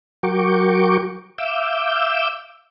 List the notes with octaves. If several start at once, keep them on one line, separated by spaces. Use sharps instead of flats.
F#3 F#4 A#4 G5 C#6 D6
E5 F5 D6 E6 G6